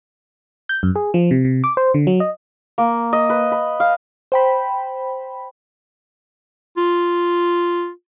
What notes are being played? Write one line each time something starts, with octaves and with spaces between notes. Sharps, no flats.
G6
F#2
G#4
F3
C3
C3
D6
C5
D3
F#3
D#5
A#3
D#5
B4
B5
F5
C5 G5 B5
F4